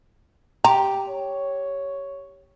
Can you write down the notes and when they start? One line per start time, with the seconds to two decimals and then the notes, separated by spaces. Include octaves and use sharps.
0.64 G4 A#5
1.09 C#5